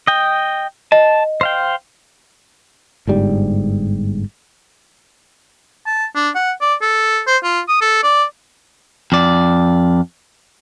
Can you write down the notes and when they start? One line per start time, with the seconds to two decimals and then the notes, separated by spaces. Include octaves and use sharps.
0.07 D#5 G5
0.92 D#5 A5
1.41 C5 F5 G5
3.07 G1 G#2 G3
5.86 A5
6.15 D4
6.35 F#5
6.61 D5
6.82 A4
7.27 C5
7.44 F4
7.69 D#6
7.81 A4
8.03 D5
9.12 F2 D5